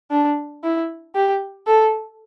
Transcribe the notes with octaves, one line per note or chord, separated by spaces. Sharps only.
D4
E4
G4
A4